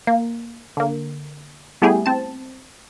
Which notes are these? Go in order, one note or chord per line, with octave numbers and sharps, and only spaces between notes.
A#3
D3 A#3
G3 A3 B3 E4 G4 G#4
C4 A5